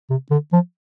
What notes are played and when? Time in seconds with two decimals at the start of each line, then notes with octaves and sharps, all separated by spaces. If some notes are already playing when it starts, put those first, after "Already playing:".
0.10 C3
0.31 D3
0.53 F3